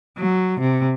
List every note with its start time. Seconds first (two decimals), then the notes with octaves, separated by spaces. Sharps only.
0.18 F#3
0.60 C3